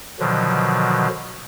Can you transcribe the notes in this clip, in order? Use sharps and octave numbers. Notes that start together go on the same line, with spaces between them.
B2 D3 D#3 F3 F#3